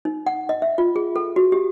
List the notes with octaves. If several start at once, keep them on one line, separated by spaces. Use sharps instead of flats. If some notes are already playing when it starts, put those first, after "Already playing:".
D#4
F#5
D#5
E5
F4
G#4
A4
F#4
G4